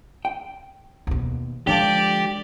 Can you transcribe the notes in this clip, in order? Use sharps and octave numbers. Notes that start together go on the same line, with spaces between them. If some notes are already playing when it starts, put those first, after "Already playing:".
G5
D#2 B2
D3 F3 G#3 G4 D5 A5